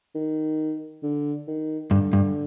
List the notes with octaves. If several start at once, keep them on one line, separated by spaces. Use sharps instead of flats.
D#3
D3
D#3
G2 D3
G2